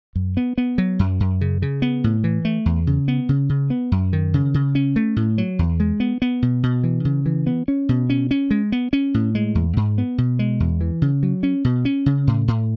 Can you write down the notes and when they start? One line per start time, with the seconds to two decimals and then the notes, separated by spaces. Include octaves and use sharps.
0.15 F#2
0.37 B3
0.58 B3
0.78 F#3
0.99 F#2
1.20 F#2
1.41 C#3
1.62 C#3
1.82 B3
2.04 A2
2.24 E3
2.45 A3
2.66 E2
2.87 C#3
3.08 B3
3.29 C#3
3.49 C#3
3.70 B3
3.92 F#2
4.13 D#3
4.34 C#3
4.54 C#3
4.75 C#4
4.96 A3
5.16 A2
5.38 F#3
5.59 E2
5.80 G#3
6.00 B3
6.22 B3
6.42 B2
6.63 B2
6.84 E3
7.05 C#3
7.26 E3
7.47 B3
7.68 C#4
7.89 B2
8.10 C#4
8.31 C#4
8.51 G#3
8.72 B3
8.93 C#4
9.14 A2
9.35 G#3
9.55 E2
9.77 G#2
9.98 B3
10.18 B2
10.39 G#3
10.60 E2
10.81 E3
11.02 C#3
11.23 F#3
11.43 C#4
11.64 B2
11.85 C#4
12.06 C#3
12.27 A2
12.48 A2